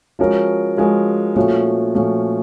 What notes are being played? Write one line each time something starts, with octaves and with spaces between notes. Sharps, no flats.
F3 G#3 C#4 F#4 A#4
F3 G#3 C#4 F#4 A#4
A#2 F3 A3 C#4 F#4
A#2 F3 A3 C#4 F#4